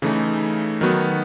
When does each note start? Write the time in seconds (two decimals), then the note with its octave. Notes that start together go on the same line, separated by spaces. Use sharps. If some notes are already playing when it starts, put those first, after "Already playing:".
0.02 C#3 E3 A3 D#4
0.81 D#3 F#3 B3 F#4